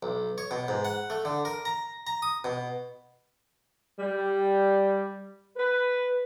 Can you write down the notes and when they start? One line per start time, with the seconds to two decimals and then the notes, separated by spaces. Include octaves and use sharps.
0.03 B1
0.38 C#5
0.51 B2
0.68 G#2
0.85 F#5
1.10 A3
1.25 D3
1.45 A#4
1.65 A#5
2.07 A#5
2.22 D#6
2.44 B2
3.99 G3
5.57 B4